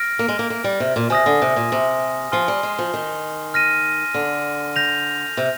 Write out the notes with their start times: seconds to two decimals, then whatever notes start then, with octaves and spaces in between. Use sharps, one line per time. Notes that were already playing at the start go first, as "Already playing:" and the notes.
Already playing: F6 A#6 D7
0.19 A#3
0.28 G#3
0.39 A#3
0.50 A#3
0.64 G3
0.80 C3
0.96 A#2
1.10 C3 G#5 D#6 A#6
1.26 D3
1.42 C3
1.56 A#2
1.72 C3
2.32 F3 G#5 C6 F6 C7 G7
2.48 G3
2.63 G#3
2.79 F3
2.94 D#3
3.54 F6 A#6 D#7
4.14 D3
4.76 G6 A#6 F7
5.37 C3